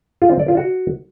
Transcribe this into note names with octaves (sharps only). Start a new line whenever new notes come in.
F4
C4
D5
F4
F#4